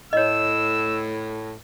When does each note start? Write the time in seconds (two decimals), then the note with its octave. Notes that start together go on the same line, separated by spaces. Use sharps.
0.13 A2 C#5 D#5 E6